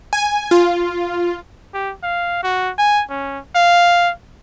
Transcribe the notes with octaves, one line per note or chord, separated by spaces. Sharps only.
G#5
F4
G4
F5
F#4
G#5
C#4
F5